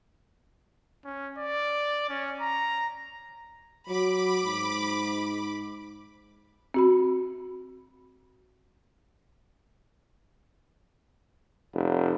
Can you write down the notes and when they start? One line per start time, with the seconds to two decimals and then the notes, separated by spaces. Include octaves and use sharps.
1.05 C#4
1.38 D5
2.09 C#4
2.41 A#5
3.88 F#3 B5 D6
4.45 G#2
6.74 C4 F#4 B5
11.74 F1